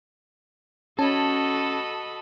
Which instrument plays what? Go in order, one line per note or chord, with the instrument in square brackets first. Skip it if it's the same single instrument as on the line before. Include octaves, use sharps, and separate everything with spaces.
[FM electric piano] C#4 [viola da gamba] F#4 A4 [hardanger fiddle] D#5 B5 [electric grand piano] A5